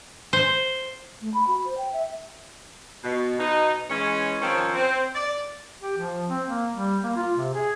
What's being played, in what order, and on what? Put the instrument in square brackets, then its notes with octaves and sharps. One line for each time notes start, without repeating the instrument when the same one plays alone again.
[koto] C5
[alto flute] A3
B5
F#4
C5
G5
E5
[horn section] B2
B2 D#4
E3 G#3 C#4
D#3 F3 C4 C#4
C4
D5
[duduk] G4
F3
C4
A#3
G3
A#3
F4
C3
G#4